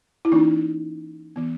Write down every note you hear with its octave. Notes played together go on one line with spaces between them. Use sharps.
E4
E3 A#3 C#4 D#4
E3 B3